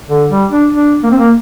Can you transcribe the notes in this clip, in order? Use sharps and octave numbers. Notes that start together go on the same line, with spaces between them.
D3
G3
D4
D4
A#3
C4
A#3